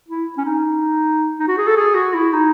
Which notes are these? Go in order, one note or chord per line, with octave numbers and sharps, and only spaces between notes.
E4
C#4
D#4
D#4
F#4
G#4
A4
G#4
F#4
E4
D#4